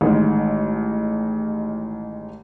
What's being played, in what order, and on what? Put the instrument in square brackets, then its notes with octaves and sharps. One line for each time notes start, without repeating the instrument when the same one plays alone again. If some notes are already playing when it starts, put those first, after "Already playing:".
[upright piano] A1 D#3 G#3